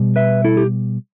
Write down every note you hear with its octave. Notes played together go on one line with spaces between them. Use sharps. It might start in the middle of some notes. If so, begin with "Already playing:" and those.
Already playing: B2 G3
B4 E5
E4 A4
G4